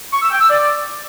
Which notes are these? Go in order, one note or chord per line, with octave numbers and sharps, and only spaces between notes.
C#6
E6
G5
E6
D5